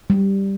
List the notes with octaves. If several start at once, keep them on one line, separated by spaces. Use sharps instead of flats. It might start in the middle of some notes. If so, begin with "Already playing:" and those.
G3